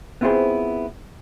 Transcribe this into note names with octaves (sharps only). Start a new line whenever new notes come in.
B3 C4 E4 F4 G#4 C5